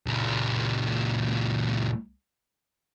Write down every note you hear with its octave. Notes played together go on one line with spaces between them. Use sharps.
C#2 A#2